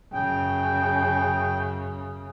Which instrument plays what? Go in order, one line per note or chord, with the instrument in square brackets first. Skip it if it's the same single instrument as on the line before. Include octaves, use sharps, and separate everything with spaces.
[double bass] F#2 C#3 [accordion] G5